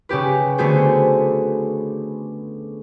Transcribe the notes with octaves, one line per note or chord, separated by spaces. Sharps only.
C#3 C#4 G4 B4
D3 A3 B3 F#4 G#4 C5